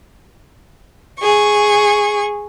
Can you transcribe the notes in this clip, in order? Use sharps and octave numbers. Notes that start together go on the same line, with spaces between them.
G#4 C#6